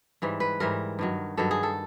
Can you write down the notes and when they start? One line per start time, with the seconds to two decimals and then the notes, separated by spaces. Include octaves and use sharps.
0.22 G#2 E3 G3
0.40 B4
0.60 G#2 E3 G3 A#4
0.99 G2 D#3 F#3
1.37 G2 D#3 F#3 A4
1.51 G#4
1.63 A4